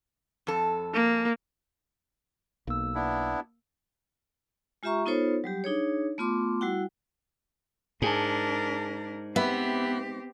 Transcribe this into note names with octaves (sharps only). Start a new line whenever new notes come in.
F2 A4
A#3
B1 A#3 E6
B3 D4 E4
G#3 F4 G4 E5 A#5 C#6
B3 D#4 F4 A4 C5 C#5
F#3 G3 G4
D4 D#4 G#4 C#5
A3 B3 F4 C6 D6
G3 E4 F#4 F#5 G5
G#2 D4 G#4 A#4 G#5 A5
B3 C4 G4 E5 B5